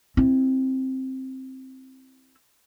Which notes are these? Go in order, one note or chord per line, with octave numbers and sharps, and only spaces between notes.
C4 E4